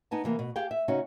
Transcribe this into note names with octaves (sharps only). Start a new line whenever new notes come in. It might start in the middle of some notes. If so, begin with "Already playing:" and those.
B3 D#4 G#5 A5
C3 E3 A#3
B2
G4 G#4 F5 G5
E5
C#3 C#4 D#4 F#4